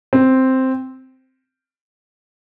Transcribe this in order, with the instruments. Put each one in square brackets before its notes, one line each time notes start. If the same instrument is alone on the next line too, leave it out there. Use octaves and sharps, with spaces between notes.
[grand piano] C4